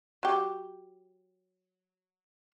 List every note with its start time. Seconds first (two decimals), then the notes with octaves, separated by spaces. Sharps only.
0.23 F#3 G4